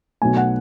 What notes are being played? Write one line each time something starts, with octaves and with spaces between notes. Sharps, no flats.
B1 B2 F#3 A3 G#5
F#5